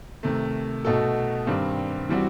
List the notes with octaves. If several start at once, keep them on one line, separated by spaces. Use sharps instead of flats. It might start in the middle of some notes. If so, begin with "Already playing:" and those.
C3 D#3 A3
B2 A3 D#4 F#4 A4
G2 D#3 G3 C4
E3 G3 C4 F#4